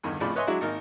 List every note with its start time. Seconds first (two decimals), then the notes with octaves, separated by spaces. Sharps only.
0.03 E2 G2 D3 D#3
0.20 G#1 A2 C#3 F3 D5 B5
0.36 B4 C#5 D#5 E5 G#5 C6
0.47 F#3 G#3 D4 E4 F#4
0.61 G#1 A#3 D#4 A#4